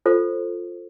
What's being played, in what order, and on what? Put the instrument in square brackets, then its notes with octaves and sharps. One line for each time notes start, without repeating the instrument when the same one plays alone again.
[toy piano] F4 A4 C5